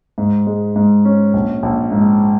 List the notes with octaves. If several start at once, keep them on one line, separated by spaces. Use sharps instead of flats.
G#2
G#3
G#2
C#4
A#1
A#1
G#2